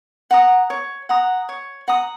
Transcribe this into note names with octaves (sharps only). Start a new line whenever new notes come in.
F#5 A#5 D#6
C#5
F#5 A#5 D#6
C#5
F#5 A#5 D#6